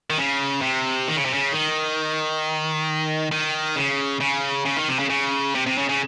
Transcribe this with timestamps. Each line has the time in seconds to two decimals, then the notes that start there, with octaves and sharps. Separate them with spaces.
0.10 D#3
0.18 C#3
0.62 C3
1.08 D#3
1.16 C#3
1.25 C3
1.33 C#3
1.53 D#3
3.32 D#3
3.76 C#3
4.20 C#3
4.65 C#3
4.77 D#3
4.88 C3
4.99 C#3
5.10 C#3
5.55 C3
5.66 C3
5.78 C#3
5.89 C#3